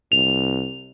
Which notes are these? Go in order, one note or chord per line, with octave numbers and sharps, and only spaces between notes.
C2 F7